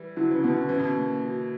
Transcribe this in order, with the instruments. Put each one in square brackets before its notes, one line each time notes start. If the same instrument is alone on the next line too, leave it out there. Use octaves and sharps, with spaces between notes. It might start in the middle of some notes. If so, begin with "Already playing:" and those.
Already playing: [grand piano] E3 G3
[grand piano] D3 F#3 [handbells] E4
[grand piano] C#3 E3
[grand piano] B2 D3 [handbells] B3
[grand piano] D3
[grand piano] E3 [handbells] C#4
[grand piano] B2 D3
[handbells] A#3
F#4